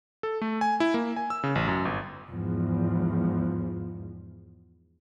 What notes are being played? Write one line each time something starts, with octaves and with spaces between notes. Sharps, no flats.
A4
A3
G#5
E4
A#3
G#5
E6
C#3
A1
F#2
G1
E2 G#2 F3